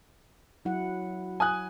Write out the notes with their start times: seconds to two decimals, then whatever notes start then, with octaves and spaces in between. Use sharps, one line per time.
0.65 F#3 E4 F#5
1.40 G#5 D#6 F#6